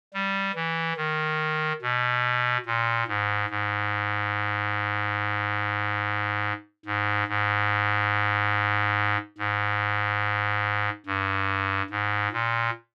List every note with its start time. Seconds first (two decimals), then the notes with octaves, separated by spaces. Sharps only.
0.14 G3
0.55 E3
0.97 D#3
1.82 B2
2.66 A#2
3.08 G#2
3.50 G#2
6.86 G#2
7.28 G#2
9.38 G#2
11.06 G2
11.90 G#2
12.32 A#2